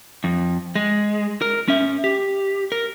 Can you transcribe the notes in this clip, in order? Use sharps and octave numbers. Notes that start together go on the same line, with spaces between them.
F2
G#3
A#4
C#4 E5
G4
A#4